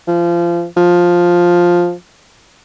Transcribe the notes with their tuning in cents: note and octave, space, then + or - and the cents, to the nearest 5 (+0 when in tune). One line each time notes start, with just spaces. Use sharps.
F3 -25
F3 +5